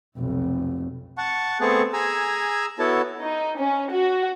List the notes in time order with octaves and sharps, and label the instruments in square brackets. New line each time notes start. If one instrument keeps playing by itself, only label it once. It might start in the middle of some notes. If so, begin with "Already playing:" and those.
[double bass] F1 B1
[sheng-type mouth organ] F#5 A5 C#6
A3 B3 C4 G#4 A5 C#6
G#4 G#5 A#5 E6
B3 E4 F#4 A4 C#5 A5
[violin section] D#4
C#4
F#4